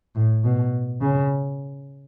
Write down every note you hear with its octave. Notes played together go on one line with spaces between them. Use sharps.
A2
B2
C#3